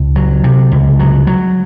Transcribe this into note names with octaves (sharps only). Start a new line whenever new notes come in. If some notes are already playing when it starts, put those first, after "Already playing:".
Already playing: C#2
F#3
C3
C#2
F#3
F#3